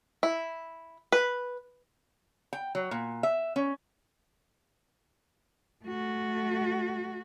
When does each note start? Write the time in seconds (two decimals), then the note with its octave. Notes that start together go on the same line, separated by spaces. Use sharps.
0.23 E4
1.12 B4
2.53 G5
2.75 F#3
2.91 A#2
3.23 E5
3.56 C#4
5.85 A3 F#4